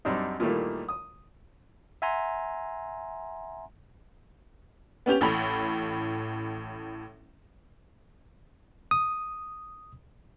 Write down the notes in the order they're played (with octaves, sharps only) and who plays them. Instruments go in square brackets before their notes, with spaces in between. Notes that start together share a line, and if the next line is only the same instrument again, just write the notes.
[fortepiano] F#2 G3 C4 D4 D#4
A#2 D#3 E3 G3 A3 A#3
D#6
[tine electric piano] E5 F#5 G#5 A#5 C6
[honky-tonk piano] B3 C#4 G4 F7
A1 A2 B5
[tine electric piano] D#6